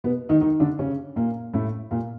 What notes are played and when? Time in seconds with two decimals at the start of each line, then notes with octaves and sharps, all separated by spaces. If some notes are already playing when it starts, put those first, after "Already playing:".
0.04 B2 B3
0.29 D#3 D#4
0.41 D#3 D#4
0.60 D3 D4
0.79 C#3 C#4
1.16 A#2 A#3
1.54 A2 A3
1.91 A#2 A#3